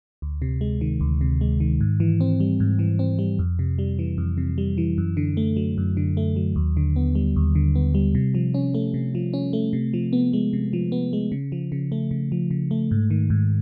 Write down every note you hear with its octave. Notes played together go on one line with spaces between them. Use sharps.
D2
C3
G#3
D#3
D2
C3
G#3
D#3
G#2
E3
C4
G3
G#2
E3
C4
G3
F2
C3
G3
E3
F2
C3
G3
E3
F#2
D3
A3
F#3
F#2
D3
A3
F#3
D#2
D3
B3
G3
D#2
D3
B3
G3
C3
F3
C#4
A3
C3
F3
C#4
A3
C3
F3
B3
G#3
C3
F3
B3
G#3
C#3
F3
C#3
A3
C#3
F3
C#3
A3
G#2
D#3
G#2